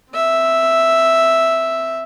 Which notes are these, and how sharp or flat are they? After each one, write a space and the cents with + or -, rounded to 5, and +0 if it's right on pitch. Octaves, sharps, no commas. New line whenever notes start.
C4 +0 E5 +0